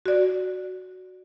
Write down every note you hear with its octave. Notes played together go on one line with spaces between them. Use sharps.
F#4 D5